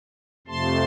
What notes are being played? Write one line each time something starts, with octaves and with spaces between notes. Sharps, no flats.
F2 C3 F3 A3 A5 C6